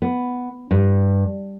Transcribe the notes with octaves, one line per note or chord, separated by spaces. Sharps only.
B3
G2